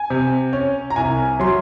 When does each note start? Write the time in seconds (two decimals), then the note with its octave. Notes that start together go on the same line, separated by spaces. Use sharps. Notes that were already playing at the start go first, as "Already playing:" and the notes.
Already playing: G#5
0.10 C3
0.53 C#4
0.90 A#5
0.96 C2 G#5
1.40 F#3 C6